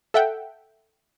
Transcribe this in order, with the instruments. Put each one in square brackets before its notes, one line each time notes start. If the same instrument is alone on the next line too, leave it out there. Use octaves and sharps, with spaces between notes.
[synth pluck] A4 E5 F#5 G5